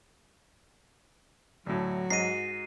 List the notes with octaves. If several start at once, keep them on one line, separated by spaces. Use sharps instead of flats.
D2 A2 F#3 F#4
G#2 D#5 C7 D#7